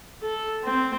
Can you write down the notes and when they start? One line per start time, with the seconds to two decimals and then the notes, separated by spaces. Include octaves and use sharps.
0.22 A4
0.64 C4